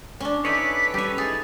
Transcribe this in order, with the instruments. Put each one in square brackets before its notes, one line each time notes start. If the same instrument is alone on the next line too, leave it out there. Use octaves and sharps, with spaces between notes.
[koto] C#4 D4
[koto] D#4 E4 [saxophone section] A4 B4 [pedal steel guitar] C#5 D5 G#5 [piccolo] B6
[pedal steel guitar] G3 C#4 [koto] G4 C#5
[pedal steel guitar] D#4 E4 [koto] G#4 [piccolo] A6